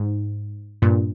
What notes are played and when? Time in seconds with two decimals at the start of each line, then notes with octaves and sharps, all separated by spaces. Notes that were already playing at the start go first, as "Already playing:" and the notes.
Already playing: G#2
0.82 G2 A#2